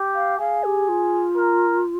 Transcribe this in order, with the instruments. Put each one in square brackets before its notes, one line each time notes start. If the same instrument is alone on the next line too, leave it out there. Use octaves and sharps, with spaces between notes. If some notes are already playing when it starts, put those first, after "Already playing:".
Already playing: [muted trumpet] G4
[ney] F5
[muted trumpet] G#4 [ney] F5
[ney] G4
F4
[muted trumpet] A#4